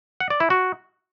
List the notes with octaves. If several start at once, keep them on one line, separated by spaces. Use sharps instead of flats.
F#5
D5
E4
F#4